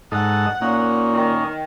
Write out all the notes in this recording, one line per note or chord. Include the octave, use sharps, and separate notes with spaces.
G#2 D#4 A4 F#5
A#2 A#3 C#4 D#4
D#3